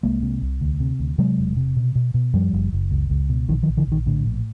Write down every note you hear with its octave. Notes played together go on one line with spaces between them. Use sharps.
C2 G#3 A#3
C3
C2
D2
C3
D2
C3 F#3 G#3
E1
C3
B2
B2
B2
F#2 F3 G3
F#1
F#1
C#2
C#2
B2
A#1 D#3 F3
D#3 F3
A#1
D3 E3
A#1 D#3
A2 D3
A#1